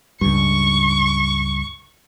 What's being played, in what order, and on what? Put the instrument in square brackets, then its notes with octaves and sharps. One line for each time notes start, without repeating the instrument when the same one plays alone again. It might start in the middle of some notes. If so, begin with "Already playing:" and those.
[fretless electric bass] C#2 G2 [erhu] C#6